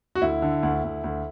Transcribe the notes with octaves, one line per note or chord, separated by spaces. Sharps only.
F#4
D2 E4
D3
D2
D2
D2